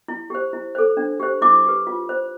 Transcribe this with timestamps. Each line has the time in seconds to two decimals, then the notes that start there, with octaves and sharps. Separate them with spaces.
0.08 E4
0.30 G4 C5
0.53 E4
0.75 A4 C5
0.97 D4
1.20 G4 C5
1.42 E4 D6
1.65 G4 B4
1.87 F4
2.09 C5